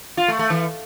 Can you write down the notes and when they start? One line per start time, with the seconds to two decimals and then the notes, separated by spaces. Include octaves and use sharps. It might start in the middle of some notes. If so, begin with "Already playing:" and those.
0.17 F4
0.28 A3
0.39 A3
0.50 E3